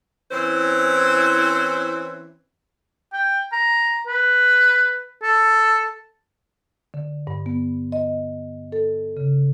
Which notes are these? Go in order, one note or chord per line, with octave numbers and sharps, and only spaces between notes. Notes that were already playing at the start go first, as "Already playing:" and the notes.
E3 C4 C#4 E4 C5
G5
A#5
B4
A4
D3
G2
B3
D#5
A4
C#3